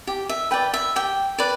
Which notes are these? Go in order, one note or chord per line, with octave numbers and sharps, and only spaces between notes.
G4
E5
B4 D5 G5
E5
G4 G5
B4 D5